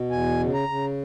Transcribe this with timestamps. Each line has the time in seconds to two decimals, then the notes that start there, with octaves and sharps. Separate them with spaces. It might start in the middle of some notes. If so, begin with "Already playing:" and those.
Already playing: B2
0.10 E2 G#5
0.39 C#3
0.54 A#5
0.69 C#3